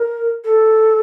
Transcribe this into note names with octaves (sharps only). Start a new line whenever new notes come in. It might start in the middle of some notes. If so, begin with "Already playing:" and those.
Already playing: A#4
A4